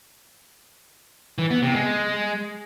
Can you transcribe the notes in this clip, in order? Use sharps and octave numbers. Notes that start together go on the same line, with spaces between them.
E3
B3
C3
G#3